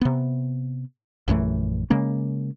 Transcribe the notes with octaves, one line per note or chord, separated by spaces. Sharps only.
C3 B3
A#1 F#2 E3 A3
C#3 G#3 A#3 C#4